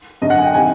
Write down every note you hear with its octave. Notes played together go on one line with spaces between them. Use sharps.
F#2 D3 D#5
F#5
G#5
G5
C3 D#3 G#5